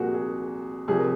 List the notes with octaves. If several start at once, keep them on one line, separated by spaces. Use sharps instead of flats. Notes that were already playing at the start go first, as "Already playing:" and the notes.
Already playing: C2 A#2 F3 F#4 G#4 A#4
G#4
C2 C3 F3 G#4
A#4